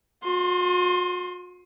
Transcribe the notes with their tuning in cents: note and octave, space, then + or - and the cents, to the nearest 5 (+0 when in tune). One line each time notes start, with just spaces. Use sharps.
F#4 -45 C6 +15